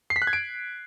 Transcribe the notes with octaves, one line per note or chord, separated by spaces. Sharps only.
C7
B6
F#6
G#6
D7